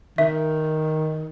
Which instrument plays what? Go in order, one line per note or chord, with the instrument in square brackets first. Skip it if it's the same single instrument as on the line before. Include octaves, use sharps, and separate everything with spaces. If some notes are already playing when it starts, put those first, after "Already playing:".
[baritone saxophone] D#3 [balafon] E5